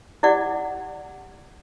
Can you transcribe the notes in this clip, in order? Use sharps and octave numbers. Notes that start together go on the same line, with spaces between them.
E4 G4 D5 F#5 D6